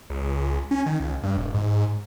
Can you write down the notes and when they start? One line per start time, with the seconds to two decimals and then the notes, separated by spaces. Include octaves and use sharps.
0.10 C#2
0.71 C#4
0.86 D#3
1.00 C#2
1.23 G2
1.37 E1
1.54 G#2